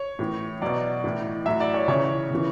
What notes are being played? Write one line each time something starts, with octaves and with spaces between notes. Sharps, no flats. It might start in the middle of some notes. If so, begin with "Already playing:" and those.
Already playing: C#5
A2 E3
B2 F#3 D5
A2 E3
A2 F#3 E5
D5
C#5
C#3 E3 C#5
C#3 E3